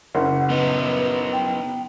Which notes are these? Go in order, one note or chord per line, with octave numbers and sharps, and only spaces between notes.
F#1 F#5
B3 D#4 B4
G5